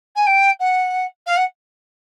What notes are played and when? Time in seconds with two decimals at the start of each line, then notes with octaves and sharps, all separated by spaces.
0.16 G#5
0.27 G5
0.60 F#5
1.27 F5
1.37 F#5